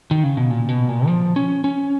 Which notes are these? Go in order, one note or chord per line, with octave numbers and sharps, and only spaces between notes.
D#3
C#3
B2
A#2
B2
A#2
F3
C#4
C#4